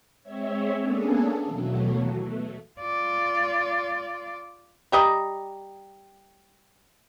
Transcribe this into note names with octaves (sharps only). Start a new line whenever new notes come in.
G#3 C4 C#5 E5
A#3 B3 C#4 D4 G#4 A4
D#2 B2 E3 F#3 A3
B2 A3
F4 D5
G3 G4 D#5 A#5